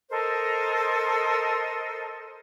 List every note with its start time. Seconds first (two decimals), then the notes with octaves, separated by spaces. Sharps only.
0.10 A4 A#4 C5 D#5